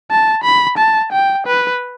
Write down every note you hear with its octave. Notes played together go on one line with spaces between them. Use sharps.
A5
B5
A5
G5
B4